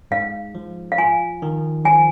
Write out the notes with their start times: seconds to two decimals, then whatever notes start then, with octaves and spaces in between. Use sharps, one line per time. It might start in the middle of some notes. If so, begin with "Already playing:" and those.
0.11 G#2 F5
0.55 F3
0.92 F5
0.98 F4 G#5
1.42 D#3
1.85 F3 G#5